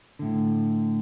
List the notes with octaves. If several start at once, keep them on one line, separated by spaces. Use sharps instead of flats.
A2 D3